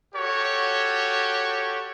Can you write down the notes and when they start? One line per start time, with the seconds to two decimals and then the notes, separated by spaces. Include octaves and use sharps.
0.15 F#4 G4 A4 C#5